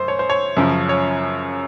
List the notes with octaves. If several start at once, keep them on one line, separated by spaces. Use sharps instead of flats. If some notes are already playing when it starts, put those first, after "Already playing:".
Already playing: F#2 C5
C#5
C5
C#5
F#2 C#3 F3
C#5